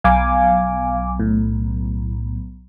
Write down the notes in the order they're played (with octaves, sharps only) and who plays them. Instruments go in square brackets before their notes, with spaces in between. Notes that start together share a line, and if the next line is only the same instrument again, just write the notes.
[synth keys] B1 [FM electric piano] F5 G#5 D6
[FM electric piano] A2